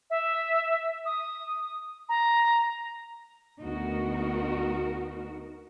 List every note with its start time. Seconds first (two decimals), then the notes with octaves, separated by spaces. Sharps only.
0.10 E5
1.05 D#6
2.09 A#5
3.61 D2 B3 D#4 F#4 A#4